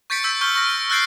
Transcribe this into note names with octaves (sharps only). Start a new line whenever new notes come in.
C#6 G6 A6 B6 C#7 D7
E6 G6 B6
C#6 F6 G6 G7
C#6 F6 A#6
D7
E6 F#6 G6 A6 C7 D7